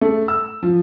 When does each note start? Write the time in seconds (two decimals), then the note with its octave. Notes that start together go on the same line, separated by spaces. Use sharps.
0.01 A3
0.28 E6
0.63 F3